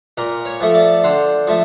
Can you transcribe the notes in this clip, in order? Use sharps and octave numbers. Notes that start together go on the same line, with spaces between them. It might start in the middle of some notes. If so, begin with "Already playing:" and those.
A#2 A#4
C#5
F3 A3
D5
D3 C5
F3 A3